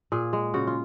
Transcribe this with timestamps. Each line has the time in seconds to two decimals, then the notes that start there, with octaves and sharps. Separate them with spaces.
0.12 A#2 G#4
0.33 G#3
0.54 C#3 F#4
0.67 F4